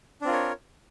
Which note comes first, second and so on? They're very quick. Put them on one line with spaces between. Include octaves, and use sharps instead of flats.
D4 C4 F4 A#4 C#5